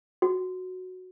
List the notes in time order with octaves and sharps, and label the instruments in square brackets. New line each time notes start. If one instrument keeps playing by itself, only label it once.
[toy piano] F#4